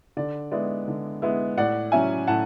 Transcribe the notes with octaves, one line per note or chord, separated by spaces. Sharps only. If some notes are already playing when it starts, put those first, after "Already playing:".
D3 D5
G#3 B3 E4 D5
D3
G#3 B3 E4
A2 D5 F#5
F#3 C#4 E4 E5 G#5
A2 F#5 A5